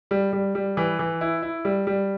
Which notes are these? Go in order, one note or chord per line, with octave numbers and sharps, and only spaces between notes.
G3
G3
G3
E3
E3
E4
E4
G3
G3